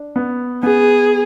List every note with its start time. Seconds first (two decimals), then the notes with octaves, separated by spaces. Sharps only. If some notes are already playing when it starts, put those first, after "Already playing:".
Already playing: D4
0.16 B3
0.63 B3 G#4